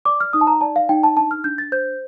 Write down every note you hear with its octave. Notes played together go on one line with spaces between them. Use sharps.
D5 D6
F6
D#4 D#6
A5
A#5
D5 A5
F5
D#4 G5
A5
D4 A5
F6
D4 G6
A6
C5 G6